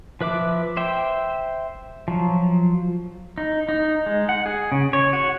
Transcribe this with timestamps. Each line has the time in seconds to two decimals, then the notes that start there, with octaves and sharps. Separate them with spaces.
0.21 F3 B4 E5 D6
0.77 C5 E5 G5
2.08 F3 F#3
3.38 D#4
3.69 D#4
4.06 G#3
4.29 F#5
4.46 G#4
4.72 C#3
4.93 C#5
5.13 F#4